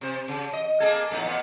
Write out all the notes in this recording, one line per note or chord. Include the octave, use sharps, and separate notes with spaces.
C3 C5
C#3
D#5
A#3 G#4 A4
A2 B3 D#4
A#2 B3